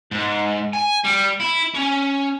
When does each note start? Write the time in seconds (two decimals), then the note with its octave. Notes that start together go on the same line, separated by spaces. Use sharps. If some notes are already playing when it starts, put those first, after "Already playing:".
0.11 G#2
0.73 G#5
1.04 G3
1.40 E4
1.75 C#4